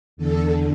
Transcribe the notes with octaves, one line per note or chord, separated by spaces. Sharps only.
E2 D3 A4